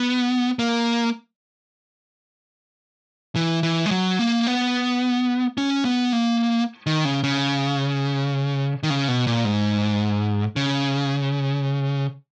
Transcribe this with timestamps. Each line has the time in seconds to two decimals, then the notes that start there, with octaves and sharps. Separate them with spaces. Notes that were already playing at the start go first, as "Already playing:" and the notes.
Already playing: B3
0.59 A#3
3.36 E3
3.63 E3
3.86 G#3
3.91 F#3
4.19 A#3
4.47 B3
5.58 C#4
5.85 B3
6.13 A#3
6.87 D#3
7.05 C#3
7.24 C#3
8.83 D#3
8.90 C#3
9.08 B2
9.27 A#2
9.45 G#2
10.56 C#3